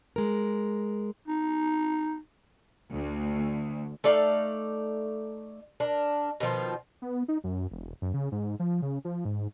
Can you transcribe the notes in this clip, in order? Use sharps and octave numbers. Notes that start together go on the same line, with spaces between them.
G#3 A#4
D#4
D2
A3 D#4 D5 F5
D4 A#4
B2 D#3 F3 F4
B3
D#4
F#2
E1
F#2
C#3
G#2
F3
C#3
F3
G#2